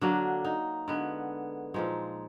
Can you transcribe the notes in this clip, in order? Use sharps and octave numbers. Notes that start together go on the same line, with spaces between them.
D3 F#3 A#3 D4
D#4
D3 G#3 B3
A#2 F3 G#3 D#4